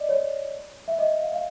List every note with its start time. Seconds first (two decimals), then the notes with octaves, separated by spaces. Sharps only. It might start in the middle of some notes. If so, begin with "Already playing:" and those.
Already playing: D5 D#5
0.09 C#5
0.88 E5
0.99 D#5
1.21 F5
1.32 F5